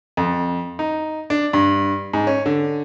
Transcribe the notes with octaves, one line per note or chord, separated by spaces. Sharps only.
F2
D#4
D4
G2
G#2
C#4
D3